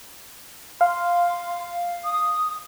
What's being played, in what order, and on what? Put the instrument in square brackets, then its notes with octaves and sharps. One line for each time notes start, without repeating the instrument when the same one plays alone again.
[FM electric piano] F5 [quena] C6
[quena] D#6